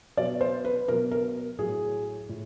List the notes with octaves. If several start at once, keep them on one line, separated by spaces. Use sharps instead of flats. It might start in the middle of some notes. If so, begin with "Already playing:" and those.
B2 F#3 D5
C5
B4
B2 F#3 A#4
A#4
A2 F#3 G#4
A2